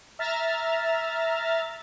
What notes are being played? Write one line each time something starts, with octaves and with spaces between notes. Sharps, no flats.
E5 A#5 F6 A6